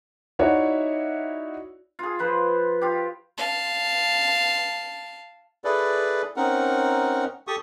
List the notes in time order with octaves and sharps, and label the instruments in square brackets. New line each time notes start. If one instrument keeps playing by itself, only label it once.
[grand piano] D#4 E4 F#4 C#5 D5 E5
[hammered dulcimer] F4 G#4
F3 B4 C5
F4 G4
[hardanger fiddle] F5 A5
[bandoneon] E4 G#4 A4 B4 D5
C4 C#4 D#4 A#4 F#5
G4 A4 C#6 D#6